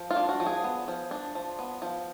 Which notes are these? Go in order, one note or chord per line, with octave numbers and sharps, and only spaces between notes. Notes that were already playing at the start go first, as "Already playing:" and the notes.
Already playing: F3
F4
D4
F#4
F3
G#4
B3
F3
D4
F3
B3
F3